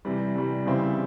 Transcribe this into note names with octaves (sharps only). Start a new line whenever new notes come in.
C3 E3 G3
C3 E3 G3
C#3 E3 G3 C4 E4